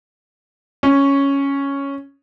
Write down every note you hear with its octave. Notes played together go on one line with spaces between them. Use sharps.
C#4